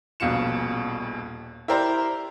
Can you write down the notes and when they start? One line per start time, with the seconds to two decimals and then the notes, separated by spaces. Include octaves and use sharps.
0.20 D#1 A#1 B2 F5 C#7 E7
1.68 E4 G4 A#4 C5 D5 A#5